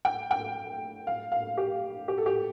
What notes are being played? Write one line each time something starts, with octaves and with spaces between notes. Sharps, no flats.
G5
G5
F5
F5
G4
G4
A4
G4